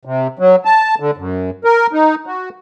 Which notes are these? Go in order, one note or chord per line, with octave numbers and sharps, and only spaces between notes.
C3
F#3
A5
D3
F#2
A#4
D#4
F#4